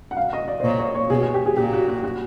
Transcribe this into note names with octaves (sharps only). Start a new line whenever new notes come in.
F#5
F5
D#5
D5
C5
A#2 C#5
C#5
C#5
B2 G#4
G#4
G4
G#4
A#2 G4
F#4
F#4
F#4